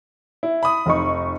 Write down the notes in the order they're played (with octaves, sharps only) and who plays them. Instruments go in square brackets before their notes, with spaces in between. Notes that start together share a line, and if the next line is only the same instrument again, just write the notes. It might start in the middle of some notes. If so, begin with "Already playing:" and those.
[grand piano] E4
B5 D#6
[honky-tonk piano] F1 D#4 C#6